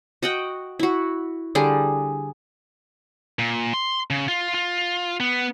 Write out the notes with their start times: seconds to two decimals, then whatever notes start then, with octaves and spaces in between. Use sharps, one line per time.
0.23 F#4 D#5 F#5 G5
0.79 E4 F#4
1.55 D3 G3 G#4
3.39 A#2
3.74 C6
4.10 C#3
4.28 F4
4.54 F4
5.20 B3